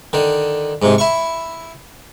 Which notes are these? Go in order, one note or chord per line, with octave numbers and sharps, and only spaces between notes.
D3 D#3
G#2 C3
E4 C#6